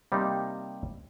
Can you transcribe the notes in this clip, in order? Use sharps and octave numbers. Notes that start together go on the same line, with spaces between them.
C3 G3 A#3 D#4 G4